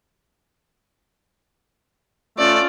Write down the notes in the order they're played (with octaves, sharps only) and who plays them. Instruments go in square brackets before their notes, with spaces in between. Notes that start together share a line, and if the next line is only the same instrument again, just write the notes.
[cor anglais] A3 [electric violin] C#4 F4 [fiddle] D5